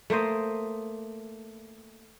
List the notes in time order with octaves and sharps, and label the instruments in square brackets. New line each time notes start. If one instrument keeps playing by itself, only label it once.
[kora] A3 A#3 C5 D#5